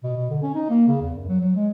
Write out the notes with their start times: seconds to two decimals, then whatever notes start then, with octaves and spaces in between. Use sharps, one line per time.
0.03 B2
0.16 B2
0.30 D3
0.43 C#4
0.55 D#4
0.69 A#3
0.87 C#3
1.01 E2
1.15 F#2
1.28 F#3
1.40 F#3
1.56 G#3